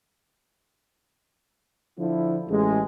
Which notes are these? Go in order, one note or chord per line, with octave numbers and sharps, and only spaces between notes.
D3 F3 E4
A1 G#3